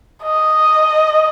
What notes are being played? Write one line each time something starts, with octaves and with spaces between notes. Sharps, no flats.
D#5